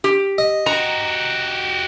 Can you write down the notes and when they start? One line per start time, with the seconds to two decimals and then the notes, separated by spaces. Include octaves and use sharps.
0.04 G4
0.38 D#5
0.66 F#4 G4 A#5